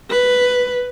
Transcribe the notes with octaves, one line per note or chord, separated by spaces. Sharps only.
B4